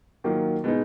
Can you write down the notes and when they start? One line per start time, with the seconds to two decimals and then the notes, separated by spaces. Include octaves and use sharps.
0.24 D#3 F#3 A#3 F4
0.64 B2 G#3 D#4